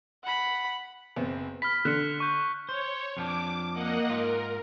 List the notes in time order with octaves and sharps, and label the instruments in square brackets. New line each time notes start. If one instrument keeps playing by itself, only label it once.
[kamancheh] F#5 B5
[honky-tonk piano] F#1 B3 C4
[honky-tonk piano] B5 [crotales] F6 B6
[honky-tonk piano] D3 [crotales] F#6 C#7
[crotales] C#6 G6
[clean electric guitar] C5 [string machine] C#5
[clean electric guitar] F2 F3 D4 [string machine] D6
[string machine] A#3 D#5 F#5
[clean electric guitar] G#2 F4 [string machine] A#4